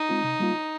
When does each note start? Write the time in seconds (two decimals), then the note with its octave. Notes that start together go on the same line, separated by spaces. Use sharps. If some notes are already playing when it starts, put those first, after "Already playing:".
Already playing: D#4
0.09 G#3 C4 F4
0.24 C3
0.40 G3 A#3 F4